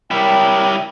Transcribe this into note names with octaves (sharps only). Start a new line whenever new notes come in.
G3 E4 A#4 C#5 G5